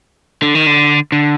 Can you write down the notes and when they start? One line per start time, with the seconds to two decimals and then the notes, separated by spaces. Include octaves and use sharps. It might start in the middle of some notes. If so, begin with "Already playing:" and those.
0.42 D3
0.55 D#3
0.67 D3
1.12 D3